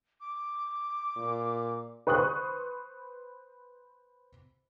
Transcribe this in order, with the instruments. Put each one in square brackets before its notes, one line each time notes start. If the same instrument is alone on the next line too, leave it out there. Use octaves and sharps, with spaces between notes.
[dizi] D6
[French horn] A#2
[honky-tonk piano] B4 C5 C#6 D#6 F#6